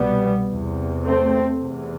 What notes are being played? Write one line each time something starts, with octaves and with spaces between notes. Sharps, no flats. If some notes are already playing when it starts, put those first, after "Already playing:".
Already playing: C2 B2 G3 B3
E2 C3
A3 C4
E2 C3